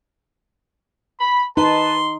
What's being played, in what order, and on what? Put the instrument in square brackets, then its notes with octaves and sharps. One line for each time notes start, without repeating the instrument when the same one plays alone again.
[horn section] B5
[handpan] D#4 [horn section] B4 A5 [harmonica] C6